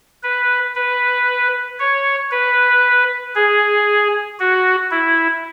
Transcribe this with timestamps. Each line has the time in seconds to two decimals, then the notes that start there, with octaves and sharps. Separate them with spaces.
0.23 B4
0.75 B4
1.80 C#5
2.31 B4
3.35 G#4
4.39 F#4
4.91 E4